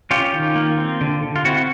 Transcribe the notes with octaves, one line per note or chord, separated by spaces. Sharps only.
C#4 F4 G4
D#3
A#3
C4
D3
D3
F4
C4 E4 F#4
F#4